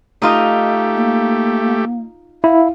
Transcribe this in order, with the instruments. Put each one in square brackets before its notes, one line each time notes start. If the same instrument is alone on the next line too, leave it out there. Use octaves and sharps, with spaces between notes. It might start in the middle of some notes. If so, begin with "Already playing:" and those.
[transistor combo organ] A3 G4 [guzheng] D#4 F4 D#5
[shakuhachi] A#3
[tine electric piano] E4 [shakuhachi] F5